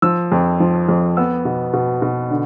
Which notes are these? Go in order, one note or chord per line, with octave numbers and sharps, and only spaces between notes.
F3 E6
F2
F3
F2
B3 E6
B2
B2
B2
D3